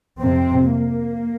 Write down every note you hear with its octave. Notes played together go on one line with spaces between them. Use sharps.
F2 C3 C4
A#3